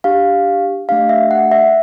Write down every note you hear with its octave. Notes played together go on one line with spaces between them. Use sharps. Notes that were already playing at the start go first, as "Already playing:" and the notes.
D4 G4 F5
A3 D4 G4 F5
E5
F#5
E5